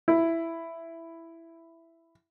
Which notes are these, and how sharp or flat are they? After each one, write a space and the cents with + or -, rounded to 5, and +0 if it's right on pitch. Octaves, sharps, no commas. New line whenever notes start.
E4 +5